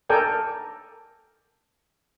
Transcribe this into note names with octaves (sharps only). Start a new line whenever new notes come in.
A4 A#4 D5 G5 G#5